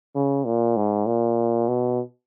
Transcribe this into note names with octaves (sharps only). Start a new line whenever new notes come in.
C#3
A#2
G#2
A#2
B2